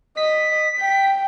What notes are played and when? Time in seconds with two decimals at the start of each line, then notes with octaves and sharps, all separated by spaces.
0.17 D#5 B6
0.80 G5